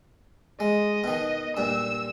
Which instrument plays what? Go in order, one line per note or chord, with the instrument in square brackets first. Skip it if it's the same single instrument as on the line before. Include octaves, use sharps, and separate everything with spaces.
[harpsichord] G#3 [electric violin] D#5
[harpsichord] B2 D#3
[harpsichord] G2 A#2 [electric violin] E6